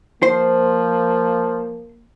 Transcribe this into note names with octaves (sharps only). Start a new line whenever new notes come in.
F3 A#3 C5